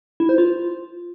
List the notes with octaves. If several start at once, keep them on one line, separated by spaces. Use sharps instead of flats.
E4
C5
F4